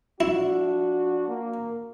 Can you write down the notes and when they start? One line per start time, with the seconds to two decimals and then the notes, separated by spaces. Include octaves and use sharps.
0.20 F3 D4 E4 F#4
1.27 A#3